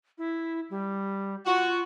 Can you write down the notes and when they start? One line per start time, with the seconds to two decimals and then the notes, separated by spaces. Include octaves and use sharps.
0.18 E4
0.70 G3
1.46 F4 F#4